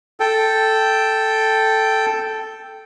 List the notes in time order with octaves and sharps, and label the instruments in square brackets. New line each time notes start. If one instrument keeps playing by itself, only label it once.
[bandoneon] A4 G5